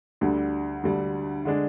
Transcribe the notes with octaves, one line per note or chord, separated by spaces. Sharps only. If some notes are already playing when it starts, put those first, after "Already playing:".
D2 D3 G3
D2 D3 G3
D3 G#3 D4